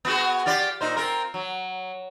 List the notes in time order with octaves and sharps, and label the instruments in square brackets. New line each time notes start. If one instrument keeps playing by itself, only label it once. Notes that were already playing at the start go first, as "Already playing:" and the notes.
[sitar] B3 F#4 G#4
F4 G4 D5
A#2 D#4 C5
C4 F4 A#4
F#3